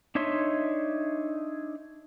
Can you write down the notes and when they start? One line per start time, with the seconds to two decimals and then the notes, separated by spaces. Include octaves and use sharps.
0.15 D4 D#4 C#5 E5 C6